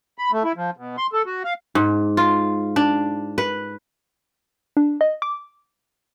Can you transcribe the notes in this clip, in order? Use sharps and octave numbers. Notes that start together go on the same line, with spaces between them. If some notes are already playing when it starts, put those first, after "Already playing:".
B5
A3
E4
F3
B2
C6
A4
F#4
F5
G#2
F4
D4
B4
D4
D#5
D6